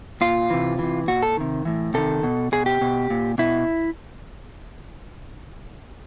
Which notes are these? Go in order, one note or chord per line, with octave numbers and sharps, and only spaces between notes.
A#2 F4
C3 E3
C3 E3
A#2 F#4
A4
C3 D#3
A2 E3
C3 D#3 A4
B2
B2 G#4
G4
B2
A#2
B2 E4